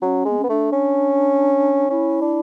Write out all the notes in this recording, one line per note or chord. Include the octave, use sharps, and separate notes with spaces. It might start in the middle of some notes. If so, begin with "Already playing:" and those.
F#3 C#4
G#3
B3
C#4
B3
A3 D4
C#4
C#4 E4
D4